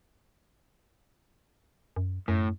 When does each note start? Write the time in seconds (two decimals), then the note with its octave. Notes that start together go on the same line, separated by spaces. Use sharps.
1.96 F#2
2.28 F#2 A2